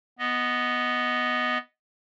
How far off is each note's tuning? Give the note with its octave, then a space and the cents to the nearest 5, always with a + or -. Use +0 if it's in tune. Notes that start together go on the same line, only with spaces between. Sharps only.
B3 +0 D#5 +0